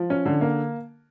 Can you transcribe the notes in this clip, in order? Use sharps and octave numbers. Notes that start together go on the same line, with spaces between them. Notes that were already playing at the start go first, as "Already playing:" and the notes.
Already playing: F3
C#4
D3
A#3